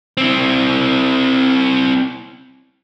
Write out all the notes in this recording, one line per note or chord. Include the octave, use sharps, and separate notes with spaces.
C4 E4